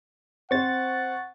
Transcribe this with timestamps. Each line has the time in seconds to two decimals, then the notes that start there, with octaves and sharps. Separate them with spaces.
0.51 C4 C5 F#5 C#6 A6